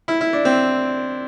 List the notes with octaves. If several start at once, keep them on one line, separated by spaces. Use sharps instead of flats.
E4
E4
D4
C4